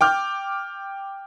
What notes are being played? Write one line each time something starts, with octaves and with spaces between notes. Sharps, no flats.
G5 D6 F6 G6